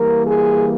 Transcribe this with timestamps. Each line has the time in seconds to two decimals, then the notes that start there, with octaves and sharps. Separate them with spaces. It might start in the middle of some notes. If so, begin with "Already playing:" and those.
Already playing: E3 G3 A#3 A#4
0.27 G#4